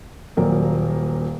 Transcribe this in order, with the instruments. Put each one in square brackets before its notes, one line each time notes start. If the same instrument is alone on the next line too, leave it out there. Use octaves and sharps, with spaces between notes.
[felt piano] D#1 A#2 F#3 A#4